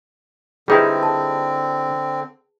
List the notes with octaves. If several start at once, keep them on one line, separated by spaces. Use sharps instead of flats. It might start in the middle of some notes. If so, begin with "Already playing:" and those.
D3 G3 C4 D#4 E4 G#4 B4 G5
A5